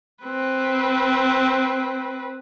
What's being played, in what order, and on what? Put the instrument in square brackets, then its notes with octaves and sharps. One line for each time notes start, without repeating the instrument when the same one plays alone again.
[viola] C4 B4